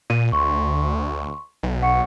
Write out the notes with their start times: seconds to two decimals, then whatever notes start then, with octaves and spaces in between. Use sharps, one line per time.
0.10 A#2 D#7
0.32 D2 C6 C#6
1.63 B1
1.82 F#5 C#6 C#7